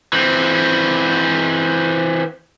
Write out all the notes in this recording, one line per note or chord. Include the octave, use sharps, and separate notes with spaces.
E3 C4